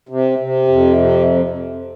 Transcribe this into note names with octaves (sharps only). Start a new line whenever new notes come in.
C3
C3
F2
C3